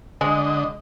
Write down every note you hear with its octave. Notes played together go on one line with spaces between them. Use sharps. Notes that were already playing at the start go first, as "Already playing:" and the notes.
D3 G#3 D#5